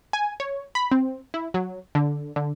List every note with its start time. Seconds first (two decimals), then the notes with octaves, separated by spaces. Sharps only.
0.13 G#5
0.40 C#5
0.75 B5
0.91 C4
1.34 E4
1.54 F#3
1.95 D3
2.36 D3